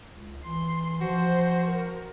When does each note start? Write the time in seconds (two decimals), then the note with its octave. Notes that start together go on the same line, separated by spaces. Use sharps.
0.12 C#2
0.44 E3 C6
1.01 F3 F#4 C5
1.65 A#4